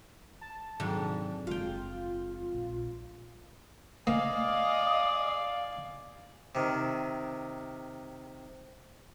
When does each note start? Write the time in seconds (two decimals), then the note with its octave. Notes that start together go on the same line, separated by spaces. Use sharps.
0.41 A5
0.80 F2 G#2 C3 D#3 F#3 D4
1.47 F#1 G#3 F4 F5 G5
2.54 A#1
4.07 A#3 D5 D#5 F5 G#5
6.55 C3 D#3